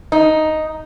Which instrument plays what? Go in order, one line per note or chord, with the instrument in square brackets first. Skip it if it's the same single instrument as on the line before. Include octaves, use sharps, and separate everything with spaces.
[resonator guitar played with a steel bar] D#4